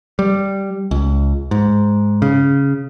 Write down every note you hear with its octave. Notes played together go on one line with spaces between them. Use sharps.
G3
C#2
G#2
C#3